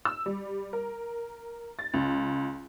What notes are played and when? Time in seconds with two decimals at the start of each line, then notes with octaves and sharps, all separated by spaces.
0.05 E6
0.26 G3
0.73 A#4
1.79 A6
1.94 C#2